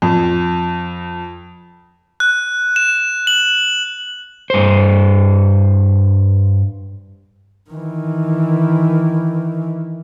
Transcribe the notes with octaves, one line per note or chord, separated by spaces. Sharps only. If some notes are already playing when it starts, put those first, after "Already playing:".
F2
F#6
E7
F#7
G2 C5
D#3 E3